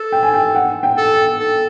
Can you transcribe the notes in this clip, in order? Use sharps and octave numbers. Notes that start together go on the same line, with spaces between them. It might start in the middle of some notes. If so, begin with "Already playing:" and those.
Already playing: A4
G5
G#5
G5
F#5
G5
A4
A4